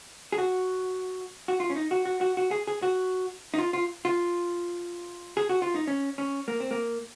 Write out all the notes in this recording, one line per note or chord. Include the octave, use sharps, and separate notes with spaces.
G#4
F#4
F#4
F4
C#4
D#4
F#4
F#4
F#4
F#4
G#4
G#4
F#4
D#4
F4
F4
F4
G#4
F#4
F4
D#4
C#4
C#4
A#3
C4
A#3